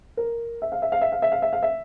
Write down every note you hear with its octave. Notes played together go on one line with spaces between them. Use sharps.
A#4
E5
F5
E5
F5
E5
F5
E5
F5
E5
F5
E5